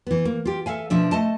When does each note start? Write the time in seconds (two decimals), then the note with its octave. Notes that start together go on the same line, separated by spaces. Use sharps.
0.07 E3 B3
0.25 A#3
0.45 F4 G4
0.66 A4 E5 F5 G#5
0.90 B2 F3 D4 E5
1.12 A3 D#5 A5